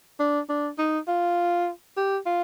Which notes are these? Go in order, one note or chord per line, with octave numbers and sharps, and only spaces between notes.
D4
D4
D#4
F4
G4
F4